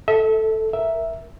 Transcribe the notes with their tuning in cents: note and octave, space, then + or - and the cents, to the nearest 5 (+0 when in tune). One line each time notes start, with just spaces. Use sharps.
A4 +0 E5 -30
A#4 +0 E5 +0